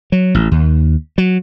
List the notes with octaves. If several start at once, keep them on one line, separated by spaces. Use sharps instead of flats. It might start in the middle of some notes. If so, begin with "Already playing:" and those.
F#3
A1
D#2
F#3